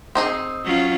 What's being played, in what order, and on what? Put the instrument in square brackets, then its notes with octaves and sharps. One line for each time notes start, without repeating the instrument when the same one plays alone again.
[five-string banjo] C4 D#4 G#4
[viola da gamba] F#3 C#4 F4